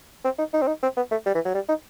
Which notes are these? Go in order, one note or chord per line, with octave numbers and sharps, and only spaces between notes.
C4
D#4
D#4
C4
D#4
C4
B3
A3
G3
E3
F#3
G3
D#4